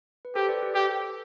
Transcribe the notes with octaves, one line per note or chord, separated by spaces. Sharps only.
B4
G4 A4 C5
B4 D5
G4 B4
G4 A4